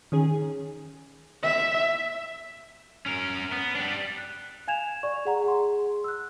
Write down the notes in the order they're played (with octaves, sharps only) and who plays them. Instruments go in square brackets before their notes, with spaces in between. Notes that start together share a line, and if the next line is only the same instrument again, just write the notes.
[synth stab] D#3 C#4 G#4
[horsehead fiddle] E5
[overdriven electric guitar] C#4 A#4
B3
G3 D4
[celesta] F#6
F5 G#5 G#6 E7 F7
D5 C#6
G#4 F#5 A#5
G#4 C6
E6 F#6